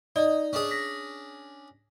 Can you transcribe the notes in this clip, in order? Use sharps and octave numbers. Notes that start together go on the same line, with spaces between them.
D#4 D5 D#5
C#4 D4 G#4
A#6 B6